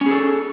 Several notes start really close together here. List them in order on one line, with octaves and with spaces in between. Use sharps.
C#4 G#4 A4